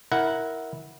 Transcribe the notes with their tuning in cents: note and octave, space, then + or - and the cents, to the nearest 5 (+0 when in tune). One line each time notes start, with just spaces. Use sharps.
E4 -15 A#4 +0 F#5 +0